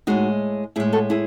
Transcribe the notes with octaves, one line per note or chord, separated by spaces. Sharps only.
A2 G#3 D#4 F#4
A2 G#3 E4 G#4
F#4 A4
E4 G#4